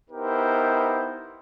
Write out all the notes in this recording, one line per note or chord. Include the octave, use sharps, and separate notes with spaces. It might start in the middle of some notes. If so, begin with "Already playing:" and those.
B3 D#4 E4 G4 A#4 C5